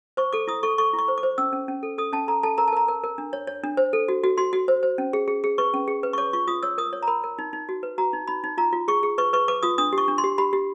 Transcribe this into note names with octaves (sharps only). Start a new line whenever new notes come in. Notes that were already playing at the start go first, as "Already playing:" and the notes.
C5 C#6
A4 D6
E4 D#6
A4 C#6
A4 C#6
E4
C#6
C5
D6
C5
C#4 E6
C#4
C#4
A4
A4 D#6
C#4 A5
A4 A#5
A4 A5
A#4 A#5
A5
A#4 A#5
A#4
A#4
D4
C#5
C#5
D4
C5
A4
F#4
F#4
F#4 C6
F#4
C5
C5
C#4
G#4
G#4
G#4
B4 C#6
C#4
G#4
B4
C#6
C#5 D6
F4 C#6
F4 D#6
C#5 E6
A#4 D#6
C#5
A#5
A#4 B5
A#4
D#4
D#4
F#4
B4
F#4 A#5
D#4
D#4 B5
D#4
F4 A#5
F4
G#4 C#6
G#4
B4 C#6
B4 C#6
B4 D6
F4 D#6
D4 D#6
G4
C#6
D4
C6
G4
G4 B5
G4